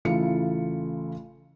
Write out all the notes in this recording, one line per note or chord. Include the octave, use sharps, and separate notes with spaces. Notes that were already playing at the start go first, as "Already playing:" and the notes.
A1 C#3 A3 E4 F4 C#7